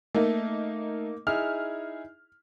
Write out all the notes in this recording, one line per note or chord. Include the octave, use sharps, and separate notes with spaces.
A3 A#3 D#4
D#4 E4 G#4 F6